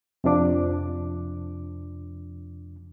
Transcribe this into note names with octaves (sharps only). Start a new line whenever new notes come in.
F2 C3 F3 D4 D6